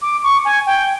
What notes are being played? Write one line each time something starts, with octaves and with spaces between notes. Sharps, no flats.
D6
C#6
G#5
G5